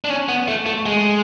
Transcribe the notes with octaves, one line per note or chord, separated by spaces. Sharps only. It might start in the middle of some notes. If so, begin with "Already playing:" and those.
D4
C#4
B3
A3
A3
G#3